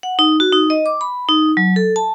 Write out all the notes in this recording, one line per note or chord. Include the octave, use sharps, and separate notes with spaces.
F#5
D#4
F#4
D#4
D#5
D6
B5
D#4
F#3
A4
A5